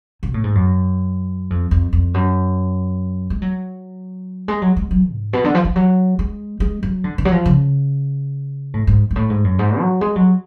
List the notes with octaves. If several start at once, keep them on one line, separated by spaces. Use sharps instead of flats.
B2
A2
G#2
F#2
F2
F2
F2
F#2
G#3
F#3
G#3
F#3
G#3
F#3
G#2
B2
D3
F3
F3
F#3
G#3
G#3
F#3
D3
D3
F#3
F3
C#3
A2
G#2
G#2
A2
G#2
F#2
G#2
F#3
G#3
F#3